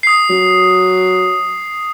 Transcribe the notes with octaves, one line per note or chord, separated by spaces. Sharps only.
D#6 C7
F#3